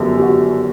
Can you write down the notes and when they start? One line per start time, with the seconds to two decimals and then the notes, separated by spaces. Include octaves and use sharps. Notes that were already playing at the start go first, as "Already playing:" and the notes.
Already playing: G1 F#2 G4 A4
0.16 G4
0.22 F#4